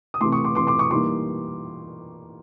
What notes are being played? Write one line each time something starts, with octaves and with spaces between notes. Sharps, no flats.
D#6
C3 E3 A3 C6 D6
C#6 D#6
C6 D6
C3 E3 A3 C6 D6
C6 D6
C#6 D#6
E3 G3 A#3 D#4 C6 D6